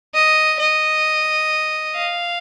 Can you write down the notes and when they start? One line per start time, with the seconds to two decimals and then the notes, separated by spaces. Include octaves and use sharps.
0.14 D#5
0.59 D#5
1.96 F5